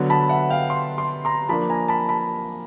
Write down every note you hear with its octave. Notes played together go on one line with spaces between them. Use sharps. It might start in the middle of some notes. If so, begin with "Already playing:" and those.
Already playing: D3 F#3 B3
A5 B5
E5 F#5
F5 G5
C6
C6
A#5 C6
F3 A#3 D4 A5 B5
G#5 A#5
A5 B5
A5 B5